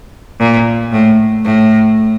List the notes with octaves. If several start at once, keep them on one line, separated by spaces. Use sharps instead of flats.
A#2
A2
A2